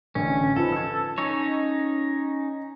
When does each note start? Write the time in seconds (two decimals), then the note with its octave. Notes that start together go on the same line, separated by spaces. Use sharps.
0.15 A1 D3 C#4
0.56 F3 D#4 A4 B4
0.72 E6 G#6
1.18 C#4 D#4 C#5